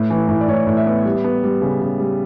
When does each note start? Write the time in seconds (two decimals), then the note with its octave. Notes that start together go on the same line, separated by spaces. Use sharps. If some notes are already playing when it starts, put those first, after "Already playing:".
Already playing: A2 B4
0.10 E3
0.29 A2
0.41 D5
0.48 A2 C#5
0.67 A2
0.77 E5
0.86 B3
1.05 G3
1.24 B3
1.44 G3
1.62 C#3
1.82 C#3
2.00 G3